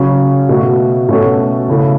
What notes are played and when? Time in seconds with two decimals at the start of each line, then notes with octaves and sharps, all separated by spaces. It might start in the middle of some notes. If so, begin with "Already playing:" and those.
Already playing: C#3 F#3 C#4
0.49 B2 A3 F#4
1.09 B2 A3 C#4 F#4 A4
1.68 C#3 A3 E4 A4